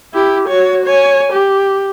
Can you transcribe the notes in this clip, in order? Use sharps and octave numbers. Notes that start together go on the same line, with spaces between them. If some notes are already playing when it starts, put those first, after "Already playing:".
E4 G4
F#4 C#5
C#5 G#5
G4